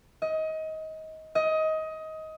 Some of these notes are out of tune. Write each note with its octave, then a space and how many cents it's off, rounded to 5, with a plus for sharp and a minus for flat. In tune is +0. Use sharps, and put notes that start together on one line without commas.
D#5 +25
D#5 +20